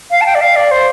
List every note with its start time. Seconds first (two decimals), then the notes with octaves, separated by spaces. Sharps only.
0.11 F5
0.21 A5
0.26 G5
0.35 D5
0.41 F5
0.56 D5
0.71 C5